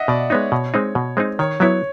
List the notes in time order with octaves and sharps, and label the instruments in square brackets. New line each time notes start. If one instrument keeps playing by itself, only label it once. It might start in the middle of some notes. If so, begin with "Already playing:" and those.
Already playing: [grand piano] D#5 E5 F#5
[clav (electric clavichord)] B2 [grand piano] D5
[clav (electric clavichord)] G#3 B3 D#4 [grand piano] C#5
[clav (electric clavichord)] B2
G#3 C4 D#4
B2
G#3 C4 D#4
[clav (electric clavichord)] D#3 [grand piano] C#5
[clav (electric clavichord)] F#3 B3 E4 [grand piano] C#5